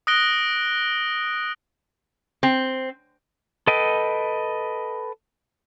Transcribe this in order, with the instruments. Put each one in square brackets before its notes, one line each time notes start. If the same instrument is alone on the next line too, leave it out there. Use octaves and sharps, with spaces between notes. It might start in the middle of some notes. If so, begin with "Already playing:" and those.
[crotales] D#6 F#6 A#6 D7 G7
[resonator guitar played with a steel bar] C4
[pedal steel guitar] A4 B4 D#5 G5